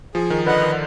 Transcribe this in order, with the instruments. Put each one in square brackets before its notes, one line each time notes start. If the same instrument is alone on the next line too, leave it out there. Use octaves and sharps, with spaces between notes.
[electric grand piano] F3 [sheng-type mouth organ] G#4
[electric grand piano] D#3
[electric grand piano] D3 [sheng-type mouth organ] B4 D#5 F#5
[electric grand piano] D#3